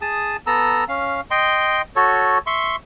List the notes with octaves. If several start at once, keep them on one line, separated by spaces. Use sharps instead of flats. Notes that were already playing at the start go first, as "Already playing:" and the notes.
G#4 A5 D#6
B3 A4 A#5 E6
C#4 F5
D#5 G5 C6
F#4 A4 C#5
E5 C6 C#6